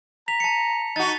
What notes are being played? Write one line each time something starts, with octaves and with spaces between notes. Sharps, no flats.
A#5 B6 F7
A5 C#7
D#4 F#4 A6